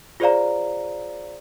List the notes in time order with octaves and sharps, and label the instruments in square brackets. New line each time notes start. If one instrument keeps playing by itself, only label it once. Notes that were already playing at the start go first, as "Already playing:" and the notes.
[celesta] F4 G#4 C5 D5 F5 A#5